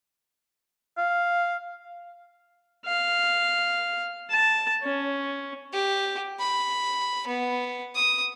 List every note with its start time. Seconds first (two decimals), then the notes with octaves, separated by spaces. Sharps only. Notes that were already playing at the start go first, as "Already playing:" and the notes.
0.97 F5
2.85 F5
4.30 A5
4.83 C#4
5.73 G4
6.40 B5
7.27 B3
7.95 D#6